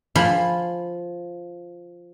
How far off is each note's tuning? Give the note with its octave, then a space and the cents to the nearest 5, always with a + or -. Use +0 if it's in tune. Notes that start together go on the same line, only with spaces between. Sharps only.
F3 +0 G#5 -15 B5 +0